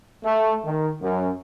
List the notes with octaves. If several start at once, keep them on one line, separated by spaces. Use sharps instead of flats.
A3
D#3
F#2